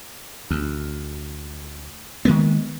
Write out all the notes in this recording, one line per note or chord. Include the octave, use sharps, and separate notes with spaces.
D2
D#3 G#3 A#3 B3